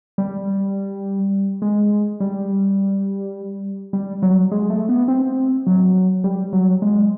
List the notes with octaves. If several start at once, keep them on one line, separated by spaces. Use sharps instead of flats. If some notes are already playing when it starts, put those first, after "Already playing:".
G3
G#3
G3
G3
F#3
G#3
A3
B3
C4
F#3
G3
F#3
G#3